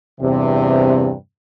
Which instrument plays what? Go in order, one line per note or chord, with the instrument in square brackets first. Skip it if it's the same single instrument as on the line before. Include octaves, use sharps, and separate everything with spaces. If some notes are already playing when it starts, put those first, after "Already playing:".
[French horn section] E2 G2 C3